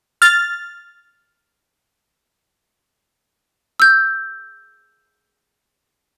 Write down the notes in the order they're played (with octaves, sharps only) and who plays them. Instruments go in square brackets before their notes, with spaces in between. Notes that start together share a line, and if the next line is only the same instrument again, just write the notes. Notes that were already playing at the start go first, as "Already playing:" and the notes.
[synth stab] F6 A6
[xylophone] E6 G6